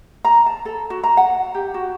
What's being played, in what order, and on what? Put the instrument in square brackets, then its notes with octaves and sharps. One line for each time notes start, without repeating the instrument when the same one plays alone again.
[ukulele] A#5
A5
A4
F#4
A#5
F#5
G4
F#4